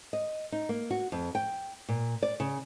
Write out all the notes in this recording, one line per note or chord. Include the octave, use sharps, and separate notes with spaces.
D#5
D#4
A#3
F#4
F2
G5
A#2
D5
C#3